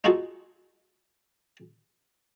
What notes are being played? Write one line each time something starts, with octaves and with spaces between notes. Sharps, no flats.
D#4 F4 F#4 G#4 A4